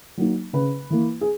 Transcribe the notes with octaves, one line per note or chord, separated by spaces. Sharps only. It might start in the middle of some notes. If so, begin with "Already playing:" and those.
F#3 A#3 D#4
C#3 B4
E3 A#3
G#4